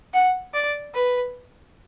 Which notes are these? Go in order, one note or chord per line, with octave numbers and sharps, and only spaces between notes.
F#5
D5
B4